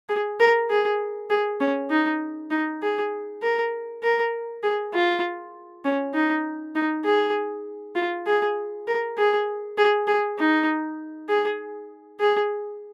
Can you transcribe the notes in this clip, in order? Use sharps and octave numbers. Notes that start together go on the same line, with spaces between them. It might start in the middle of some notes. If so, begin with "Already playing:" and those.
G#4
A#4
G#4
G#4
C#4
D#4
D#4
G#4
A#4
A#4
G#4
F4
C#4
D#4
D#4
G#4
F4
G#4
A#4
G#4
G#4
G#4
D#4
G#4
G#4